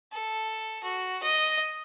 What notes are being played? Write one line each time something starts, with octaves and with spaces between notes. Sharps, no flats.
A4
F#4
D#5